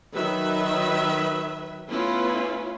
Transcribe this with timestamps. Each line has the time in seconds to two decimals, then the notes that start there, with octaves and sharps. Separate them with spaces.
0.14 D#3 F#3 B4 E5
1.88 A3 B3 C#4 E4 F4 B4